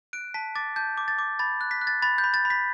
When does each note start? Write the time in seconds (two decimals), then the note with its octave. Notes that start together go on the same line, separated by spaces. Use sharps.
0.13 F#6 D7
0.34 A5 B6
0.56 D6 A6
0.76 A5 G6
0.97 D6
1.08 A6
1.19 D6
1.39 B5 A6
1.61 F#6
1.71 B6
1.81 F#6
1.87 A6
2.02 B5 A6
2.18 G6
2.24 B5
2.34 A6
2.45 B5
2.50 B6